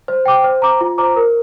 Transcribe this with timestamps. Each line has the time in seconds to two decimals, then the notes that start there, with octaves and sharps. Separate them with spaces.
0.08 C5
0.26 G5 D6
0.44 C5
0.62 A#5 D6
0.81 F4
0.98 C5 A#5 D6
1.16 A#4